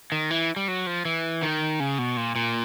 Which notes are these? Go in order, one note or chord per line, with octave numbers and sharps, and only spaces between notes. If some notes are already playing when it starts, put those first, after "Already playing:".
D#3
E3
G3
F#3
F3
E3
D#3
C#3
B2
A#2
A#2